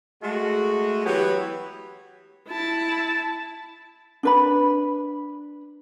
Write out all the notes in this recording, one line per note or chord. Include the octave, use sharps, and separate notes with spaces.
G#3 A3 F#4
E3 F#3 B3 G4 B4 C#5
E4 A5
D4 B4 B5